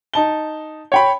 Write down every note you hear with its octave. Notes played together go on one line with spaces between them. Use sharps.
D#4 A5 G7
C#5 G5 B5